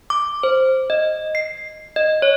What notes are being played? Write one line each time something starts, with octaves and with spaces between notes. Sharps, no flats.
D6
C5
D#5
C7
D#5
C#5